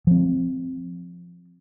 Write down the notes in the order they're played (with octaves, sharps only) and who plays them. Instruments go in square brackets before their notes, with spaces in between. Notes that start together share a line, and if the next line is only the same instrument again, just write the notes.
[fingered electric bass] F3 C4